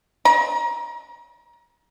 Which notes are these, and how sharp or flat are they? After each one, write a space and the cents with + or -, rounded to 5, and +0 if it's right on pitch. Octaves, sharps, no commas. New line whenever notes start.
A#5 +30